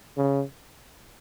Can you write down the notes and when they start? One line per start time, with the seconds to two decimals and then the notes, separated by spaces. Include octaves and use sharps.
0.17 C#3